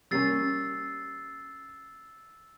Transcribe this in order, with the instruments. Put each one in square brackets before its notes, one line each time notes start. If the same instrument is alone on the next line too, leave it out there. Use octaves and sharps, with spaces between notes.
[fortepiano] G3 A#3 C#4 [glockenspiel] E6 A6 C7